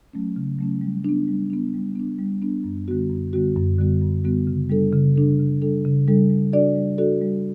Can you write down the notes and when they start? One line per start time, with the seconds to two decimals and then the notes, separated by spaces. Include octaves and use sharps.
0.13 F#3 A3 C#4
0.36 C#3
0.59 F#3 A3 C#4
0.81 G3
1.05 B3 D4
1.28 G3
1.50 B3 D4
1.74 G3
1.96 B3 D4
2.18 G3
2.42 B3 D4
2.64 F#2
2.88 D3 G3 B3 F#4
3.10 F#2
3.33 D3 G3 B3 F#4
3.56 F#2
3.78 D3 G3 B3 F#4
4.02 F#2
4.24 D3 G3 B3 F#4
4.47 C#3
4.70 G3 D4 A4
4.92 C#3
5.16 G3 D4 A4
5.39 C#3
5.62 G3 D4 A4
5.85 C#3
6.08 G3 D4 A4
6.30 G3
6.53 D4 F#4 A4 D5
6.76 G3
6.98 D4 F#4 A4 D5
7.22 G3